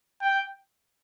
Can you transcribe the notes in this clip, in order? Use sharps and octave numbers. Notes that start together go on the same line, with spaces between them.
G5